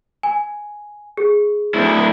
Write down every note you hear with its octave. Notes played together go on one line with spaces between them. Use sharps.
G#5
G#4
D2 E4